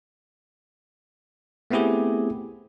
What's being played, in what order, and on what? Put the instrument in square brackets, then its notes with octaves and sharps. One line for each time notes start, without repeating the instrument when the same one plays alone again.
[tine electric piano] A3 B3 C4 E4 G4 G#4